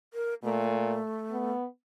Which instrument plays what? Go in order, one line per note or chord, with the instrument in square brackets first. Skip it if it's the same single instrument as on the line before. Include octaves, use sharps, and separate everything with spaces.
[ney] A#4
[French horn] A#2 [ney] A3
[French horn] B3